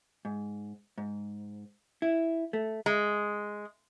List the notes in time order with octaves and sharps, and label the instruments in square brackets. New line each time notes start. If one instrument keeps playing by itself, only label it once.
[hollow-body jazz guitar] G#2
G#2
E4
A3
[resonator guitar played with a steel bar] G#3